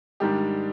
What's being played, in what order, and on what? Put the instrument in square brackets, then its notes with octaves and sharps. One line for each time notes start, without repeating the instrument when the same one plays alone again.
[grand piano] G#2 D#3 G3 D4 G4